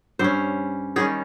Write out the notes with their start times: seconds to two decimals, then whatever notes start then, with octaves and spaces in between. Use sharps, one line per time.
0.19 G2 G3 C#4 C5
0.96 D#3 G3 C#4 G#4